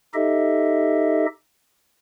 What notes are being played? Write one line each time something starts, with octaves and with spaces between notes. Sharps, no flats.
D#4 G4 A4 D#5 E5